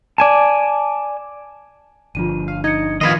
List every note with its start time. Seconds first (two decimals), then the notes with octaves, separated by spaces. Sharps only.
0.18 D5 G#5 A5
2.15 G1 D3 F3 F4 D#7
2.48 F5
2.64 D#4 D#5 G#6 C#7
3.01 D#3 F3 F4 B4 D#5 C6 G#6 D#7